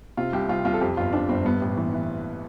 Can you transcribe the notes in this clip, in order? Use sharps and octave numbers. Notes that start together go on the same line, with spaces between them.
C3 F4
C2 G4
C2 F4
C2 F4
A4
F2 G4
G1 F4
F2 D4
G1 C4
G2 B3
A1
E3
E3